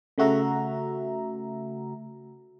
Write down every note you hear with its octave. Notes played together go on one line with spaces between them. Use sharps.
C#3 A3 F#4 E5 A#5